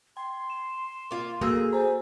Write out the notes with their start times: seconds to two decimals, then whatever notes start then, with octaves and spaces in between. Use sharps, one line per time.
0.17 G5 C6
0.50 E7
1.11 A#3 F4
1.41 A#3 F#4 G#4 A4 E6
1.73 C5 G#5 A#5